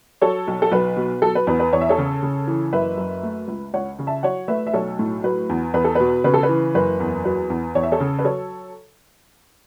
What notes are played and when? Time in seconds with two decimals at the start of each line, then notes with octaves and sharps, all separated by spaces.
0.22 F#3 A4 C#5
0.48 B1
0.62 A4
0.71 B1 B4
0.97 B2
1.22 F#3 A4
1.35 B4
1.47 E2 B4
1.60 B4
1.73 E2 C#5
1.81 E5
1.89 A4 C#5
1.98 C#3
2.23 C#3
2.47 E3
2.73 F#1 B4 E5
2.97 F#2
3.23 A3
3.48 C#2
3.74 C#2 C#5 F#5
3.99 C#3
4.07 E5 A5
4.23 F#3 C#5 F#5
4.48 A3 B4 E5
4.67 E5
4.73 B1 A4 C#5
4.99 A2
5.24 F#3 B4
5.50 E2
5.74 E2 B4
5.84 A4
5.95 B2 B4
6.24 C#3 B4
6.34 A4
6.43 B4
6.49 E3
6.74 F#1 B4
7.00 E2
7.25 F#3 B4
7.50 E2
7.75 E2 C#5
7.83 E5
7.92 A4 C#5
8.00 C#3
8.19 B4
8.25 F#3 A4 C#5